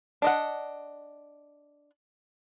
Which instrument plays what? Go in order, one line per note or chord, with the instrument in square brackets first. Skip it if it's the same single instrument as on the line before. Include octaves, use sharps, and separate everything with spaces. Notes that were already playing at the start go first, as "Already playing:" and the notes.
[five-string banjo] D4 D#5 F#5